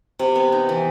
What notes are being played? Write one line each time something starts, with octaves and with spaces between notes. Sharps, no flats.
C3
B3
D#4
E3